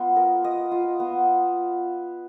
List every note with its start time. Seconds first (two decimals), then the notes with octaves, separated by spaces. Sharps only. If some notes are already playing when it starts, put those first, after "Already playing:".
Already playing: B3 F4 D#5
0.16 A#4
0.44 D#5
0.71 F4
1.00 B3